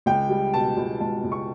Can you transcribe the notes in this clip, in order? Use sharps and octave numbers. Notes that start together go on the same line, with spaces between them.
C#2 G5
G3
B2 A5
C#2
C#2 A5
C#2
C#6